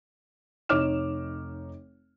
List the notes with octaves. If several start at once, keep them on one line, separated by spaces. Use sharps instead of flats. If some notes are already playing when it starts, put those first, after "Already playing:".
F1 D#4 C#5 D6 F6 E7